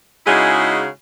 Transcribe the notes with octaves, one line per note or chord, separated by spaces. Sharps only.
C#3 G#3 D#4 E4 F#4 G#4